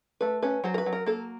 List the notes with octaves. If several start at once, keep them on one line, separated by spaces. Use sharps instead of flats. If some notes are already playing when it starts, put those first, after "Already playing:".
A3 B4
C#4 B4
F#3 C5
A#4
B4
F#3
A#4
A#3 A4